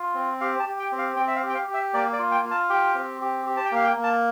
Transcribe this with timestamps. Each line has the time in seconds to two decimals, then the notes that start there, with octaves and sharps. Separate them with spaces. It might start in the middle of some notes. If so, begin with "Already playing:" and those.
Already playing: F4
0.14 C4
0.41 G4 F5
0.60 A5
0.66 G4
0.79 G5
0.92 C4
0.98 F5
1.16 C4 G5
1.27 E5
1.36 F5
1.43 G4
1.49 G5
1.55 F5
1.68 G4
1.74 E5
1.94 A#3 D5
2.13 D5
2.19 F4
2.31 G5
2.45 F4
2.51 A5
2.70 G4 G5
2.95 C4
3.21 G4
3.46 G4
3.57 A5
3.65 G5
3.71 A#3 F5
3.84 G5
3.96 A#3
4.04 A5